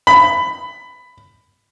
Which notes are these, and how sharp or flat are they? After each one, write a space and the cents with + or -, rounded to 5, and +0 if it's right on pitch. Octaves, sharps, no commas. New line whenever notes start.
B5 +15